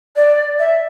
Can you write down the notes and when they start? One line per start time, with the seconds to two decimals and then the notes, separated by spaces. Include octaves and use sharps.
0.16 D5
0.59 E5